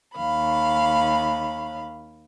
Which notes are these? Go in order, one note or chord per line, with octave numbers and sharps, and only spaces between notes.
D#2 F5 B5